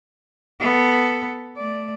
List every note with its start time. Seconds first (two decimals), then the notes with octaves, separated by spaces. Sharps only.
0.60 B3 A4
1.57 A3 D5